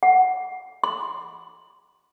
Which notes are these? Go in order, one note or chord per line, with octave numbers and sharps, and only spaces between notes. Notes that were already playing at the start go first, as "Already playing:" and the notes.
F#5
C6